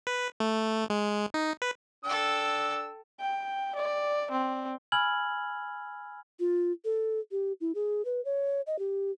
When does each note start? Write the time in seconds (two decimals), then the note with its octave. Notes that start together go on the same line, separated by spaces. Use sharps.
0.07 B4
0.40 A3
0.90 G#3
1.34 D#4
1.62 B4
2.05 D4 A4 G5 E6
3.20 G5
3.76 D5
4.31 C4
4.92 G#5 B5 E6 F6 G#6 F#7
6.39 F4
6.85 A4
7.31 G4
7.61 E4
7.75 G#4
8.05 B4
8.25 C#5
8.67 D#5
8.79 G4